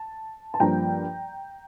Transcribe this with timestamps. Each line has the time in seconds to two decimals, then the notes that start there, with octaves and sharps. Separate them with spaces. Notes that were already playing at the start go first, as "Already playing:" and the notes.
Already playing: A5
0.54 A5
0.60 G2 F3 A#3 G5 A#5